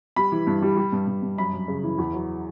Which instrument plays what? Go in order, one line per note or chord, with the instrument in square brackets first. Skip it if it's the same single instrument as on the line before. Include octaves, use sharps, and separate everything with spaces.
[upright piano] G3 B5
E3
G2
G3
G3
G2
G2
G2
F#2 B5
F#2
C#3
E3
E2
F#3